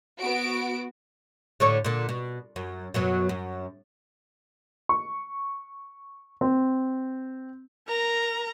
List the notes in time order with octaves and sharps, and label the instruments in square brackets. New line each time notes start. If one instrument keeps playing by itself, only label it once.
[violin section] B3 F#4 D7
[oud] A2 D3 C#5
A#2 D3
B2
F#2
F#2 B2 F#3
F#2
[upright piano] C#6
C4
[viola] A#4 A#5